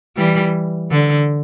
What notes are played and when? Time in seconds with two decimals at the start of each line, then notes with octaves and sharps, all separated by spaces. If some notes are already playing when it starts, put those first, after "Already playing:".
0.17 E3 G3
0.91 D3